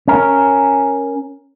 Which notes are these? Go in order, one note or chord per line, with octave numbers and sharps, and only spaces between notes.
C#4 A#4